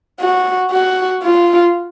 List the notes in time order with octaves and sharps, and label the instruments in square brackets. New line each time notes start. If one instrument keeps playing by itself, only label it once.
[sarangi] F#4
F#4
F4